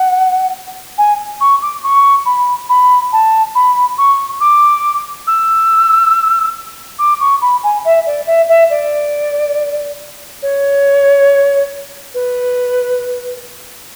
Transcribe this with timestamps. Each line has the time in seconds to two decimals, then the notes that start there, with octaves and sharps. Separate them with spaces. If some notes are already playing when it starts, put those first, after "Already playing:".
Already playing: F#5
0.98 G#5
1.41 C#6
1.62 D6
1.83 C#6
2.26 B5
2.69 B5
3.13 A5
3.55 B5
3.98 C#6
4.41 D6
5.27 E6
6.99 D6
7.21 C#6
7.42 B5
7.63 G#5
7.85 E5
8.06 D5
8.27 E5
8.49 E5
8.70 D5
10.42 C#5
12.14 B4